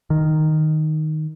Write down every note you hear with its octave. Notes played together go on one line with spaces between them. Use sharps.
D#3